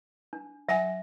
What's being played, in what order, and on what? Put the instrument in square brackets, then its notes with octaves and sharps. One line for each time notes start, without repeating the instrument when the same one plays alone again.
[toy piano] D4
[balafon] F#3 F#5 G#5 [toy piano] E5